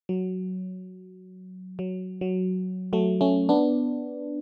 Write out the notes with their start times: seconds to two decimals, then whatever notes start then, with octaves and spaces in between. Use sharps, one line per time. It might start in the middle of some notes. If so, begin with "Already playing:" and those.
0.09 F#3
1.79 F#3
2.21 F#3
2.93 F#3 A3
3.21 A3 C#4
3.49 B3 D4